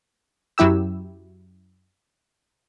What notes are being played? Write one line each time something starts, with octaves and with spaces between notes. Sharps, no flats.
F#2 F#3 E4 G4 E6